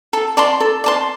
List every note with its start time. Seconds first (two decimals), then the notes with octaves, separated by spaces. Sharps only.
0.13 A4
0.37 D5 A5 C6
0.60 A4
0.84 D5 A5 C6